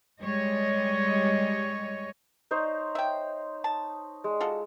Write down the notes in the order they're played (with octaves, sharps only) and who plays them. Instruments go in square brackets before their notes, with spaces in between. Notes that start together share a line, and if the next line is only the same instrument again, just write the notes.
[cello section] G3 G#3 C#5 D#5
[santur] D#4 C5 C#5
[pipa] E5 G5
A5
[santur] G#3
[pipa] F4 F#4 A4